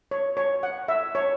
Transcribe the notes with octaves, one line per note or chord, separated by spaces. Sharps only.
C#5
C#5
F#5
E5
C#5